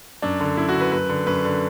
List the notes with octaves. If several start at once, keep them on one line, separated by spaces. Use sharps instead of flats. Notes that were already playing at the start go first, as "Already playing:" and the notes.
F#2 D4
D3
F#2 E4
F#4
D3
B4
F#2 B4
D3
F#2 B4
D3